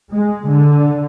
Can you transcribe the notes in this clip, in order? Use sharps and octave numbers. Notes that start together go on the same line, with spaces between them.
G#3
D3